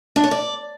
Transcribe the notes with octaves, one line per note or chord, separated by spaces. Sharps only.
D4
C#5
D5